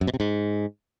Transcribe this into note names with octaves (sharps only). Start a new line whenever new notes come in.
F#2
B2
C3
G#2